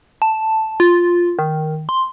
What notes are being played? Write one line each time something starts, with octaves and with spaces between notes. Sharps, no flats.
A5
F4
D#3
C6